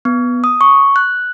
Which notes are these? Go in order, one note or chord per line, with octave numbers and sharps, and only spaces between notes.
B3
D#6
C#6
F#6